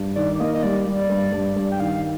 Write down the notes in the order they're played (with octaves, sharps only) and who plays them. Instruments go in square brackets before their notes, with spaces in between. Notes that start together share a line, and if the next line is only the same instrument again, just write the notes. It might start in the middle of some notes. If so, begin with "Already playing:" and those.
Already playing: [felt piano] G2
[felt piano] D#3 [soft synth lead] D5
[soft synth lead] D5
[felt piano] A#3 [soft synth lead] D#5
[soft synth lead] D#5
[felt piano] G3 [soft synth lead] D5
[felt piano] G3
G2
G2
G2
[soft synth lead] G5
[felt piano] D#3 [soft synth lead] F5